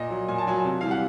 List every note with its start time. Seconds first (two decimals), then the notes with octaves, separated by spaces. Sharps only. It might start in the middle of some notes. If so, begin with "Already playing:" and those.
Already playing: A#2 D#5
0.10 F#3
0.28 A#2 G#5
0.38 A5
0.47 F#3 G#5
0.65 C3
0.81 E3 G3 F5
0.91 F#5